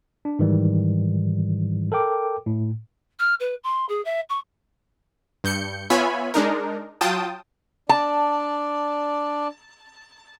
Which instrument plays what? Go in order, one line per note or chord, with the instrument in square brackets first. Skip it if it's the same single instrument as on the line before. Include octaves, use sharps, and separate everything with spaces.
[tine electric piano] D4
G#2 D#3 E3 G3
A4 A#4 G5 D6
A2
[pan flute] F6
B4
C6
G#4
E5
C#6
[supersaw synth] G2 G6 C#7
B3 F4 C#5 E5 G#5 B5
G#3 D4 D#4 A#4
F#3 F4 G5 A5 D#6
[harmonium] D4 D5 [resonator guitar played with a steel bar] A5